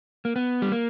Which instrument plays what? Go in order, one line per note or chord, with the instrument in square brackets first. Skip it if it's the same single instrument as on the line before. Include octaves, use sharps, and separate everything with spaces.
[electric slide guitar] A#3
B3
G3
A#3